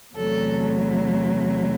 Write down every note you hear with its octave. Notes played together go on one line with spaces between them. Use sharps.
E2 C3 F#3 A3 A4